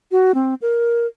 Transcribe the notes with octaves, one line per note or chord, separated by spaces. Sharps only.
F#4
C4
A#4